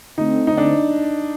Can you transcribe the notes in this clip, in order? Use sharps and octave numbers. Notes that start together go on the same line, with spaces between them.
D3 A3 C4 D#4
D#4
D4